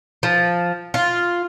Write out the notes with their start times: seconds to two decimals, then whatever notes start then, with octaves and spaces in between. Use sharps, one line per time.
0.23 F3
0.94 F4